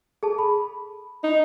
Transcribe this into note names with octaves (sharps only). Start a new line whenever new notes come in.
G#4 A4 A5
B5
D#4